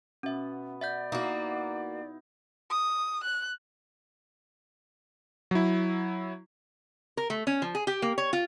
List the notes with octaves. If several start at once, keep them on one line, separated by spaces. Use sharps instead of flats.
B2 B3 C#4 E5
D5 E5 F#5 G6
A#3 D#4 E4 F#4
D#6
F#6
F#3 E4
A#4
A3
C#4
F3
G#4
G4
A#3
C#5
F4